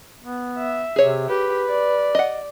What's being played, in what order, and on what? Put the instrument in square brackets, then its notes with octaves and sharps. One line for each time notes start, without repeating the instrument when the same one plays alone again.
[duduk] B3
[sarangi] E5
[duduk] C3 [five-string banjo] G#4 C#5
[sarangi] G4 [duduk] B4
[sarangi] D5
[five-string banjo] D#5 F#5